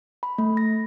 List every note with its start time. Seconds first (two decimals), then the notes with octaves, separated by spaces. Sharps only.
0.23 B5
0.38 A3
0.57 A#6